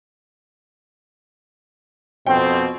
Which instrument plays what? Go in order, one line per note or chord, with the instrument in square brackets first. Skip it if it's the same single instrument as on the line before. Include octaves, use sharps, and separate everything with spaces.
[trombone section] F2 B2 C4 [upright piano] G5